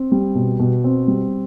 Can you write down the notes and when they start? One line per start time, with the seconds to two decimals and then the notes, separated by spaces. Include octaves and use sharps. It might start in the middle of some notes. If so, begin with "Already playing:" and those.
Already playing: C4
0.12 G3
0.35 B2
0.59 B2
0.84 C4
1.08 G3